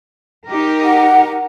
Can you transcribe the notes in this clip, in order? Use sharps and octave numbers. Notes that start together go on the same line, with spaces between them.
D#4 G4 A#4
F#5